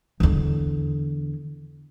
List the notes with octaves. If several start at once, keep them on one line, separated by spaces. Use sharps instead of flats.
E2 D3